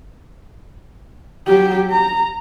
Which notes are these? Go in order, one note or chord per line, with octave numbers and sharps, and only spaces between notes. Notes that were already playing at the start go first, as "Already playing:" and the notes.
F#3 G4
A#5